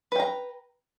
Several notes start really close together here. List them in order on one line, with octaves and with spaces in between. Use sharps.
B4 G5 A#5